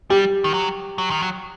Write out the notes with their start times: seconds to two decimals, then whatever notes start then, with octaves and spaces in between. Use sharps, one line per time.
0.10 G3 G4
0.44 D#3
0.54 F#3
0.98 F#3
1.11 D#3
1.22 F#3